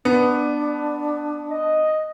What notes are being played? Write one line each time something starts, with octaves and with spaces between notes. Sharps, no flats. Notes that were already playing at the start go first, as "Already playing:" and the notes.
B3 D4
D#5